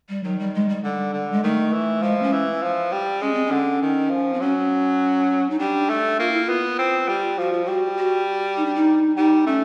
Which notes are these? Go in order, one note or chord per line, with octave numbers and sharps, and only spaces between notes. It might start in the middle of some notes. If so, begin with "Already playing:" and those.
G3
D#3 F#3
G3
G#3
G3
D3 G3
D3
G#3
D#3 A3
E3
F3 G#3
C#4
E3
F3
G3
G#3 C#4
C4
C#4
D3
D#3
F3
C4
F#3 C#4
D#4
G3 D4
A3
A#3 F4
E4
F4
B3
C4
G3
F3 F#4
F4
G3 F#4
F#4
D#4
D4
D#4
G3 D#4
A3 C#4